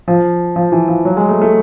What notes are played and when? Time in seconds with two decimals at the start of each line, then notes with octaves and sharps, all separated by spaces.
0.08 F3
0.56 F3
0.72 E3
0.88 F3
1.05 F#3
1.17 G#3
1.29 A3
1.42 A3